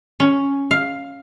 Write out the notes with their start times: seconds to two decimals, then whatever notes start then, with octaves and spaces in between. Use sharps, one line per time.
0.20 C#4
0.71 F5